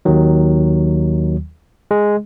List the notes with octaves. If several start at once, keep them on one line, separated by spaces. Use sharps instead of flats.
D#2 D#3 F#3
G#3